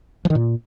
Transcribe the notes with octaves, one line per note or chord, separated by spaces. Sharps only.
F3
D#3
A#2